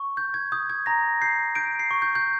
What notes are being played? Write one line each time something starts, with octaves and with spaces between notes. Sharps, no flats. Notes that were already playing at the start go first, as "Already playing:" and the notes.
Already playing: C#6
G6
G#6
D#6 G6
G#6
A#5 A#6
G6 C7
G6 D7
C7
C#6
G6
G6